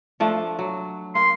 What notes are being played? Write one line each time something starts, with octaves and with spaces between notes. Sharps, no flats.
F3 A3 D4
F#3
A#3 C6